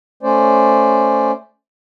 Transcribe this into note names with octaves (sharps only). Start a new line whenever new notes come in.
A3 C#4 C5 D5